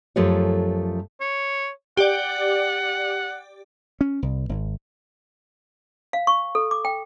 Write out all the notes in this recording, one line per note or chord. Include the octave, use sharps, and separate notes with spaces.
F#2 F3 A3 F4 G4 C#5
C#5
G4 D5 F#5
C#4
C2
G#1
F5
C#6
A4
D6
G5